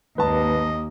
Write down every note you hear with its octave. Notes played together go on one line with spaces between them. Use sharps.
G#1 D#2 A#3 B4 D#5 A5